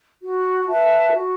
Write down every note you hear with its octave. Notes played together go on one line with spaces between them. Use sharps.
F#4
B4 E5 A5
F#4